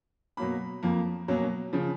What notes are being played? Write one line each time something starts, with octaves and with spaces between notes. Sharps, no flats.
B2 F#3 A#3 B5
F2 F3 A#3
B2 F#3 A#3 C#4
C#3 F3